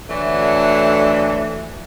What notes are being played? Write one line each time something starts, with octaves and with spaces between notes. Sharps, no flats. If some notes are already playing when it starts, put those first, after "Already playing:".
D2 D3 E3 F#3 A3